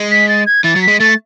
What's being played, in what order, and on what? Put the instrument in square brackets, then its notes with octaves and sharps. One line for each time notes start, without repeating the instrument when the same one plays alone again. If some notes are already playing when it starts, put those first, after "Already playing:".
Already playing: [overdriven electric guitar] G#3
[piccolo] B6
A6
G#6
[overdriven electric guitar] E3 [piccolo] A6
[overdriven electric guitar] F#3
[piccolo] B6
[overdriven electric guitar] G#3
[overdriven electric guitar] A3 [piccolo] A6